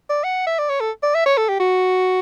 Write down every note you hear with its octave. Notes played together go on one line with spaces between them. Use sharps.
D5
F#5
E5
D5
C#5
A4
D5
E5
C#5
A4
G4
F#4